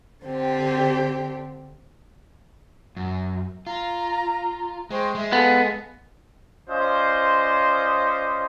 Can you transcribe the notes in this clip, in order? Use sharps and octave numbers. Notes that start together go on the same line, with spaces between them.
D3 C4 G4
F#2
F4 A#5
G#3 C5 G5 C#6
G#3 E5
B3 A4 F5 G#5
C#4 F4 C5 D5 D#5